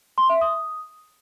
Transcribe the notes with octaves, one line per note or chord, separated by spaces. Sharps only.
C6
E5
D#6